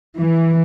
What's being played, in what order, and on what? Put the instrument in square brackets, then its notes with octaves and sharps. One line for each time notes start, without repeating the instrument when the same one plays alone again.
[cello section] E3